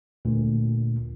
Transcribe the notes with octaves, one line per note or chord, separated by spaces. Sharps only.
D2 A#2